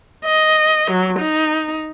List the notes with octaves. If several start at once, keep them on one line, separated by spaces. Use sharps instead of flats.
D#5
F#3
D#4